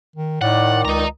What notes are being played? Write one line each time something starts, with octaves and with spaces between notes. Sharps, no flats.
D#3
A2 D#3 D5 F#5
C#2 D#5 A#5